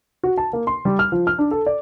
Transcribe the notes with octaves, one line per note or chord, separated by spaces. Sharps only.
F#4
A5
A#3
C6
G3
F6
F3
F6
D4
A4
D5